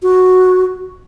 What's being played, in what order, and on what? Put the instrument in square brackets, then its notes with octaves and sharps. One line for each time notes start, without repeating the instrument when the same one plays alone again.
[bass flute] F#4